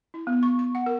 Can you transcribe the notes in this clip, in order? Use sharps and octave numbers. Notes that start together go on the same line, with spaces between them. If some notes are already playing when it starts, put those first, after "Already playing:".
E4
B3
C#6
C#6
F#5
A#4